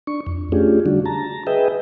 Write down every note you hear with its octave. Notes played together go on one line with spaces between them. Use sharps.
D4 C#6
F2
A3 C#4 D4 F4 G4 G#4
D3 G3 D4 F#4
A5 A#5
G#4 B4 D#5 E5 G5